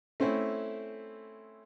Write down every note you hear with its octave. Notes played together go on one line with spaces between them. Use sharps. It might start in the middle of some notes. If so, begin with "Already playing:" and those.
A3 C4 C#4 E4